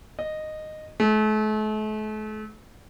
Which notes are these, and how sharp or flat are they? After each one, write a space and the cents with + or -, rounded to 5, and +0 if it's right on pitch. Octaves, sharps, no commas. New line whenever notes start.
D#5 -10
A3 -40